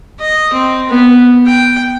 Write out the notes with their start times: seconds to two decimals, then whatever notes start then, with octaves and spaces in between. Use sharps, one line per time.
0.20 D#5
0.53 C4
0.89 B3
1.46 G5